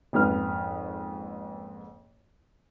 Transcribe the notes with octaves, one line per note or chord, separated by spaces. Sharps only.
F#1 F2 G#2 B4 F6